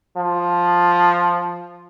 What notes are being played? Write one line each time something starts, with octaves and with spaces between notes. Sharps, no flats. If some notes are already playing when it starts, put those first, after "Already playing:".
F3